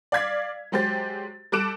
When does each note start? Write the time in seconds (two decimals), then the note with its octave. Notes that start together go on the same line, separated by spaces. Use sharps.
0.12 D5 F5 G#6 B6
0.72 F#3 G#3 G4 C5 A6
1.52 G3 A4 D6 F#6 D7 E7